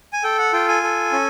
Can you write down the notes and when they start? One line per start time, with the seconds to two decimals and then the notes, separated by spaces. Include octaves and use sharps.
0.13 G#5
0.23 A4 G5
0.39 F#5
0.53 F4 G5
0.68 G#5
0.83 A4
1.12 C#4